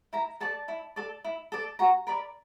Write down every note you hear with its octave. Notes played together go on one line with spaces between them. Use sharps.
E4 A#5
A4 D5 A5
E4
A4 D5
E4
A4 D5
F#4 A#5
A#4 D5 B5